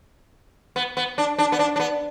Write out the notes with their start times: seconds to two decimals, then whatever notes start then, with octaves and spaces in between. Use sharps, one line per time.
0.76 B3
0.97 B3
1.18 D4
1.39 D4
1.52 B3
1.59 D4
1.76 D4
1.80 B3